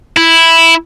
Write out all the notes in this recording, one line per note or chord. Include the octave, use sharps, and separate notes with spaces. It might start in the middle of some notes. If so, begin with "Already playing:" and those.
E4